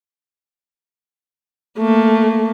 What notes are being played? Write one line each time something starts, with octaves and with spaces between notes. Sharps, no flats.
A3 A#3